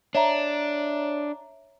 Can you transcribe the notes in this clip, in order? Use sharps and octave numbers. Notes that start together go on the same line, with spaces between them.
D4 C#5 E5 A#5